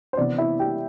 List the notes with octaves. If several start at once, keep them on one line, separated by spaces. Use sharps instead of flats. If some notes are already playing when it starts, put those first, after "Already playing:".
C5
C3 E3 B3 D4 D5
E4 E5
G4 G5